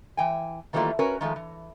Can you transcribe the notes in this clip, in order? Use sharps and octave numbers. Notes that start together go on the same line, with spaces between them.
E3 G5 G#5
D#3 E3 G3 A3 A#3 F4
C#4 F#4 A#4 B4 C#5
D#3 F3 G#3 A3 A4
E3